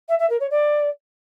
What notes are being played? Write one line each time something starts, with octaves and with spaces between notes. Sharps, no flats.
E5
E5
A#4
C#5
D5